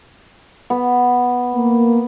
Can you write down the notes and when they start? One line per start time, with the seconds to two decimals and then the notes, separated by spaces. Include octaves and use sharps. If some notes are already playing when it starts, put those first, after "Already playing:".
0.70 B3
1.55 A#3